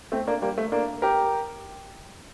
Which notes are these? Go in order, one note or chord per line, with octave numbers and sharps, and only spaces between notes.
A3 C4
A#3 D4
G3 A#3
A3
A#3 D4
G4 A#4